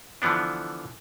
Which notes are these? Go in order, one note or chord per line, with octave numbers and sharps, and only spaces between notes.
D3 E3 F3 B3 D4